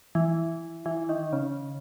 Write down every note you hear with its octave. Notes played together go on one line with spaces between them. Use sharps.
E3
E3
D#3
C#3